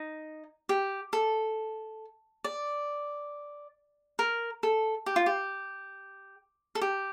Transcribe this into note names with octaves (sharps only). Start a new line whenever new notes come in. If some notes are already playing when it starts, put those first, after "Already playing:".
Already playing: D#4
G4
A4
D5
A#4
A4
G4
F4
G4
A4
G4